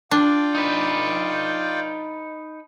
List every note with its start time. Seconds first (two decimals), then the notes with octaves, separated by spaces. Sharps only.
0.11 D4 F4 D5 G5 A5
0.55 D#4 B4